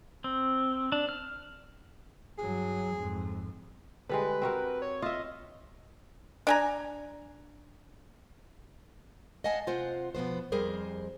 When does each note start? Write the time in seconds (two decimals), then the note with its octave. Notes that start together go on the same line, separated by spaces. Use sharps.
0.24 C4
0.92 D4
1.09 F6
2.38 G2 F#3 G#4
2.95 F2 G#2
4.09 D3 G3 G#3 B4
4.42 C4 F#4 A#4
4.82 C#5
5.02 F4 D#5 E5
6.47 D4 G#5 A#5
9.44 D#5 F5 F#5 G#5 A5
9.67 C3 F4 C5 F#5
10.15 B2 F3 B3 C5
10.52 F2 G3 G#4 A#4 C5